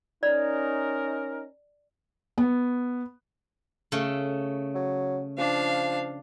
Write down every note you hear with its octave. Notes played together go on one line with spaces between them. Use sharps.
C#4 D#4 A#4 D5
B3
C#3 A3
F#3
F3 D4 F5